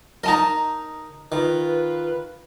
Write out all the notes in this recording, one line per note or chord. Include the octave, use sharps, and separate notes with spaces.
D#4 A#4 D#5 A5 A#5
D#3 F4 B4